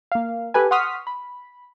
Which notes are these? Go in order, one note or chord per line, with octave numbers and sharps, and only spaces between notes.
A#3 F5
G4 A4 B4 G#5
F#5 C6 C#6 D#6 F6 B6
B5